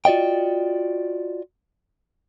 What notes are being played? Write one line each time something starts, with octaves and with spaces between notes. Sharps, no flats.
F4 F#4 D5 D#5 G5